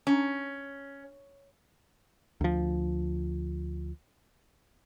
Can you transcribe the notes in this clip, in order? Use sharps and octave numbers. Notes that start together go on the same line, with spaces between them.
C#4
D2 F3